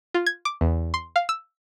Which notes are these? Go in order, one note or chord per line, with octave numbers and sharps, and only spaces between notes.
F4
G#6
D6
E2
C6
F5
E6